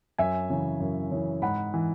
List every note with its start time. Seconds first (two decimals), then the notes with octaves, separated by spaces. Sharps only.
0.18 F#2 E5 G#5
0.50 C#3 E3
0.80 F#2
1.11 C#3 E3
1.42 G#2 F#5 B5
1.74 E3